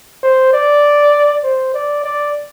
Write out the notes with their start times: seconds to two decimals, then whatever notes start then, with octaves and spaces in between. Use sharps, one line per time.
0.23 C5
0.53 D5
1.43 C5
1.74 D5
2.04 D5